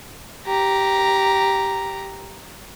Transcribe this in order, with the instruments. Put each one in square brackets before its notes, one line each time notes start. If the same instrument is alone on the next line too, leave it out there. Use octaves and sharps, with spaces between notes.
[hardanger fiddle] G4 A#5